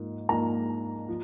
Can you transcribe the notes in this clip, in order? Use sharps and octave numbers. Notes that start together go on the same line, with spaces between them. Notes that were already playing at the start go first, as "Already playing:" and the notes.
Already playing: G#2 F3 A#3
G#2 F3 A#3 A#5
F3